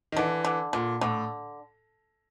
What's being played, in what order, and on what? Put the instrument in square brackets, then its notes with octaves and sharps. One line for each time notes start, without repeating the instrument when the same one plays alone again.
[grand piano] D#3
[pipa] D3 [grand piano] E3
[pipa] D3
[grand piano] A#2 [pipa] D3
[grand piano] A2 [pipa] D3